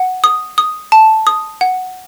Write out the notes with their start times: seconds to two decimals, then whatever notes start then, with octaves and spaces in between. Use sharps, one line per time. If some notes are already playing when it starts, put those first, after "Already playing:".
Already playing: F#5
0.24 D#6
0.58 D#6
0.92 A5
1.27 D#6
1.61 F#5